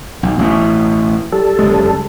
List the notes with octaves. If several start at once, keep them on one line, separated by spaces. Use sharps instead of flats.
B1
A1 B2
G3 A4
F#1 G#3